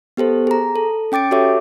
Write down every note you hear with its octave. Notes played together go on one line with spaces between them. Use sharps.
B3 G4 A4 C5
G#4 A#5
A4
C#4 G5 D6 A6 D7
F#4 G4 A4 C#5 E5 D6